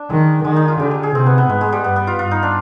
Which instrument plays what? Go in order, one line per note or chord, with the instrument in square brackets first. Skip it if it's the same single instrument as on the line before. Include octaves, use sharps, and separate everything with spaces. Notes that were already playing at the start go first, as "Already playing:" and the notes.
Already playing: [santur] D4
[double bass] D#3 [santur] G#3
[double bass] D#3 [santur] G#3
[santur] D#4
F4
[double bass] D3 [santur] G4
[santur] G#4
G#4
[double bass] C3 [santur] C4
[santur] B3
B3
[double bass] G#2 [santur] G#3
[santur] G#3
G3
[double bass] G2 [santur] B3
[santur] B3
F4
[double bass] G2 [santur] F4
[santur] D#4
D4